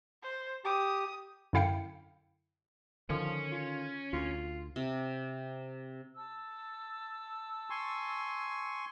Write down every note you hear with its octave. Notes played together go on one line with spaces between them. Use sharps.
C5
G4 D#6
F#2 D3 E4 F5 G5 C#7
D3 D#3 F3 C#4
F4
D2 F4
C3
A5 E6
G#5 C6 C#6